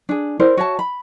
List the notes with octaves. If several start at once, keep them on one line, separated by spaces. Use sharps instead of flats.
D4 G#4
E4 A#4 C5 D5
F#4 C#5 E5 A5
B5